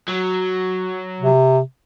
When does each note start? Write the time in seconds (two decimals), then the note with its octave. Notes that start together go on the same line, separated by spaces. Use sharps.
0.09 F#3
1.20 C3